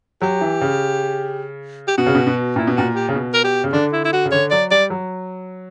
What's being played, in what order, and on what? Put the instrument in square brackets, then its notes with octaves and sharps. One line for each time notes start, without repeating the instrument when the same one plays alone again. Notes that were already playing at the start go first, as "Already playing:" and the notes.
[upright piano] F#3 [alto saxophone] G4
[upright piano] E3
C#3
[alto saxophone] G4
[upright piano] B2 [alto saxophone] F#4
[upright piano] C#3
B2
B2
[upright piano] A#2 [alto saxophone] E4
[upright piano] B2
[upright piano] A#2 [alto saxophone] F#4
[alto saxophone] G4
[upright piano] C#3
B2
[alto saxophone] A#4
G4
[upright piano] C#3
[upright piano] D3 [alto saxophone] D4
[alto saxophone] E4
E4
F#4
[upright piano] C#3
[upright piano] D3 [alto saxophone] C#5
[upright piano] F#3 [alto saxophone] D5
[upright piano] G3 [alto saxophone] D5
[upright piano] F#3